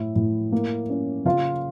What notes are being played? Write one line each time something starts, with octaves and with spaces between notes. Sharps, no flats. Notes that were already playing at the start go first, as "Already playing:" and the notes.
Already playing: A2 E4 E5
A2
A#3
C#4
C#3 F4 F5